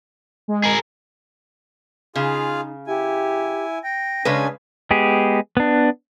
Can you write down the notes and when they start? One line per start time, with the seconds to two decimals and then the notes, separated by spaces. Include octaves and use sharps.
0.48 G#3
0.64 G#4 A#4
2.16 C#3 D#4 F4 G#4 F5
2.87 E4 G4 G#5
3.84 G5 A#6
4.25 C#3 G#3 C#4 D4 B4 G#5
4.91 G#3 B3 G4 G#4
5.57 B3 D4